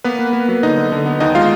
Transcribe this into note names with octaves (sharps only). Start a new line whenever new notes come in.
A#3 B3 B4
A#3
A#3
F#3
D3 D#4 D#5
D3
D3
B3
D#2 D#4 D#5
G#3 F4 F5